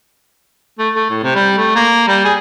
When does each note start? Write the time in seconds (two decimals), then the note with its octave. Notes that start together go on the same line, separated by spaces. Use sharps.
0.79 A3
0.95 A3
1.10 A2
1.23 C3
1.35 G3
1.58 A3
1.76 A#3
2.08 G3
2.25 G#4